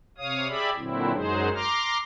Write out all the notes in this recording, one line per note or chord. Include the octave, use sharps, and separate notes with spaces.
C3 C#5 F5 D#6
G4 G#4 D5 E5 B5
A#2 D3 F#3 C4 E4
F#2 F#3 G#3 D#4 G#4 C5
A#5 C6 D6 F6